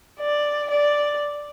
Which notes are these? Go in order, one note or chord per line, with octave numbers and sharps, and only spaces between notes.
D5
D5